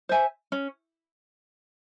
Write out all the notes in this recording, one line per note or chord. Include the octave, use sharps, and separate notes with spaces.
C5 E5 G#5
C#4